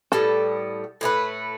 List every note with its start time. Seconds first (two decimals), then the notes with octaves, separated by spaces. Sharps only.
0.12 A2 G3 B3 A4
1.01 A2 A3 G4 B4